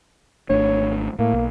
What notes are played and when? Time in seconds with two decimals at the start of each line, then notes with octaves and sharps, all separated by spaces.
0.50 G#1 A3 D4 C#5
1.19 A2 A#3
1.33 B1